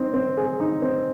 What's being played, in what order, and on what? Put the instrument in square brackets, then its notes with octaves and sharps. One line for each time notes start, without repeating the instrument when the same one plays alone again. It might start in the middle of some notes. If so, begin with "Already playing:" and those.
Already playing: [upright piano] C4 D#4
C4
G#4
D#4
C4